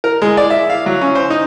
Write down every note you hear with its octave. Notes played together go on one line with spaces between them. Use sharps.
A#4
G#3
D5
E5
F5
F#3
C#4
C5
D#4